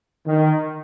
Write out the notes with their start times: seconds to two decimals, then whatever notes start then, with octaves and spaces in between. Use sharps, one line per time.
0.27 D#3